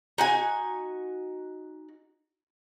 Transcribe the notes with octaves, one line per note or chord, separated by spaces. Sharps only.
D#4 F#4 G#5